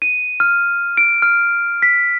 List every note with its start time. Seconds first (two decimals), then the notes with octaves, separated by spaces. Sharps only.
0.02 D#7
0.40 F6
0.97 D7
1.22 F6
1.82 B6